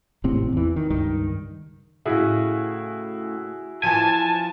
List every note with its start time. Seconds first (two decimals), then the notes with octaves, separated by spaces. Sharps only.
0.24 G#1 A2 C3 C4
0.52 E2 E3
0.76 D#3
0.90 C#2 G2 D#3
2.06 A2 C#3 E4 F#4 G#4
3.83 E3 F3 G#5 A5